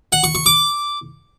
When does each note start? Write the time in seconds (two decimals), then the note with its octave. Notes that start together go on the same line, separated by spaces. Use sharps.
0.12 F#5
0.24 C#6
0.35 C#6
0.46 D6